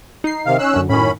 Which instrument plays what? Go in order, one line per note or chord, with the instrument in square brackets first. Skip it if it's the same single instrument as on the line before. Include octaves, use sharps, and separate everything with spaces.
[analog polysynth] D#4 C7
[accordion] C3 D#3 F5
C#4 E6 F#6
[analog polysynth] F#2 D3
[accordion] F#2 C#4 B5 [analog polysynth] A2 D#3